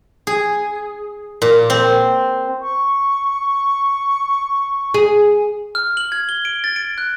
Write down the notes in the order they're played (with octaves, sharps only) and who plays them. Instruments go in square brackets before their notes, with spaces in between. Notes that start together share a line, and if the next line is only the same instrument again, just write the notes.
[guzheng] G#4
A#2
C4
[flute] C#6
[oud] G#4
[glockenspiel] F6
F#7
G#6
G7
D7
A6
D7
F#6